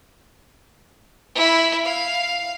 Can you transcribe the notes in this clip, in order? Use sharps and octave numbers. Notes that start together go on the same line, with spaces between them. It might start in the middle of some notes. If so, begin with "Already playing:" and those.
E4 B5
F5